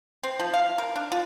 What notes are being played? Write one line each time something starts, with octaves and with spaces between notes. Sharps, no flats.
C4
F3
F5
A#4
D4
F4